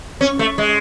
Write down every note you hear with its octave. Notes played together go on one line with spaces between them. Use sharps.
C#4
A3
G#3